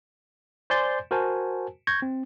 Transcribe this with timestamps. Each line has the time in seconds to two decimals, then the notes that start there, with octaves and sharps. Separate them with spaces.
0.70 C5 D5 G#5 C6 G6 A6
1.11 F#4 A#4 C5 G#5 A5
1.87 C#6 G6 G#6 A#6
2.02 C4